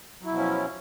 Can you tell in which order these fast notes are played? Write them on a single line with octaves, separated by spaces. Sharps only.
F#3 E4 B2 F3 C#4